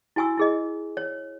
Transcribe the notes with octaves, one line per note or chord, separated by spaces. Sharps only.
E4 F#4 G#5 C#6 E6
E4 G#4 D#5
C#5